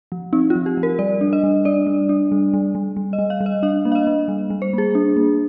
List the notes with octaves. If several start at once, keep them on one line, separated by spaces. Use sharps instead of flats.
F3
C4 D#4
F4
F3
G4
F3
A#4
G3 D5
D4
D#5
G3
D4 D5
G3
D4
G3
G3
G3
G3
D#5
G3
F5
G3
D#5
D4 F5
A#3
F5
D#5
A#3
G3
G3
C5
A#3 G#4
D4
A#3